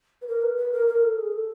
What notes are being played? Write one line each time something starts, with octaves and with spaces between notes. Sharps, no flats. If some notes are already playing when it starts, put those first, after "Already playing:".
B4
A#4
B4
B4
A#4
A#4
A4
G#4
A4